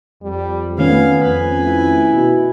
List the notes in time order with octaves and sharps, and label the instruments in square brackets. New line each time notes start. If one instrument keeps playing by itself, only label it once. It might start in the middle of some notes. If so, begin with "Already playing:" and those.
[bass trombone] F2 [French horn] G3
[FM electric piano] D#3 A3 C#4 [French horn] B3 [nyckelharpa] F5 G#5
[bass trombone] F2 [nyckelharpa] B4 G#5
[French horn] E4
[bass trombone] B2